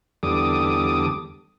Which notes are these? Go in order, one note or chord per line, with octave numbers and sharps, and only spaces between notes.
E2 D3 G3 A4 D6 D#6